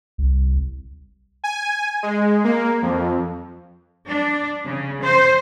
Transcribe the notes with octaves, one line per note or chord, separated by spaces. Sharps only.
C2
G#5
G#3
A#3
F2
D4
C#3
C5